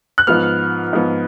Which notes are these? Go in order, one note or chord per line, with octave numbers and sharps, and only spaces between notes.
F#6
G#2 F3 B3 F6
G#2 F3 B3